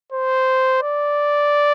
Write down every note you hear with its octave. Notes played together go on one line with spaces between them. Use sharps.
C5
D5